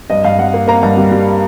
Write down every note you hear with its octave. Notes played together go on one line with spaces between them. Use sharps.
G2 D#5
G2 F5
G2 F#5
A#3
A#3 A#5
G2
G3
G3